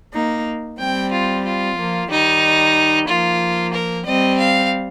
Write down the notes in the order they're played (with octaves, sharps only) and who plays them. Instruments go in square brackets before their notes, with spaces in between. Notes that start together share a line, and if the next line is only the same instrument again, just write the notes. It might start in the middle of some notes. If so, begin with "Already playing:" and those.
[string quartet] A#3 D#4
[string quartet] G3 C4 [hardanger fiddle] G5
[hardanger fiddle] F4
F4
[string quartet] F3 A#3
[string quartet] D#3 G3 [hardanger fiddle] D#4
[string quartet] F3 A#3 [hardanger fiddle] F4
[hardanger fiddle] A#4
[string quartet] G3 C4 [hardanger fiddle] D#5
[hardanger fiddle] F5